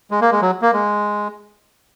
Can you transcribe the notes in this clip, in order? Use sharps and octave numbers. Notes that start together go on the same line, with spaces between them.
G#3
A#3
G#3
F#3
A#3
G#3